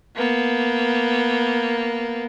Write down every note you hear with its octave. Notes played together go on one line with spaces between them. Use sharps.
A#3 B3